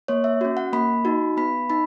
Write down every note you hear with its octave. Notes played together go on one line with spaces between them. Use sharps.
A#3 C#5
E5
C#4 F#4
F#5
A#3 B5
D#4 F#4
B3 B5
D#4 B5